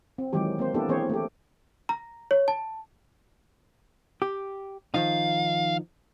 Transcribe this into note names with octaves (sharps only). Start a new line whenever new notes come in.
C4
D#3 E3 F#3 G#3 G4
A#3 C4 C5
A#3 B3 D4 E4 G4 A4
E3 A#3 C4 G#4 C5 C#5
A3 G4
A#5
C#5
A5
G4
D#3 F3 D#4 F5